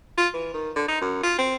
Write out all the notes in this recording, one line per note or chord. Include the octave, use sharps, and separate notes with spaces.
F4
E3
D#3
D3
D#4
F#2
F4
C4